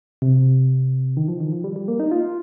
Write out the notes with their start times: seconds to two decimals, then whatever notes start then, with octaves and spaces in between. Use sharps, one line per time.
0.22 C3
1.17 D#3
1.28 F3
1.40 D#3
1.52 F3
1.64 G3
1.76 G3
1.88 A#3
2.00 D#4
2.11 F4